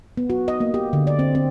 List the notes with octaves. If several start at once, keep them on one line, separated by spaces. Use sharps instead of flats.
B3
F#4
D#5
A#3
G4
D3
D5
C4
C4